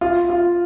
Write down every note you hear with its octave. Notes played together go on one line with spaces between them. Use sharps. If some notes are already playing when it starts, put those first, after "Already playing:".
F4
F4